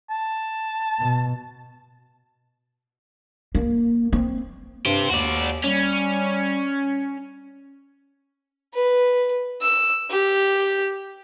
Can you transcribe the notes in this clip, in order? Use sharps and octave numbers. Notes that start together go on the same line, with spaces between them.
A5
B2
A#3
C4
G2 G4 C5
D#2 F#4 D5
G3 C#4
B4
E6
G4